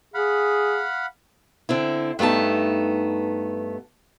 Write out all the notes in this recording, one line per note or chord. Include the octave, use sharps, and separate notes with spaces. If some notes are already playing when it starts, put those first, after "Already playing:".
G#4 F5 F#5 B5
D3 C4 E4
G2 A3 B3 D#4 A5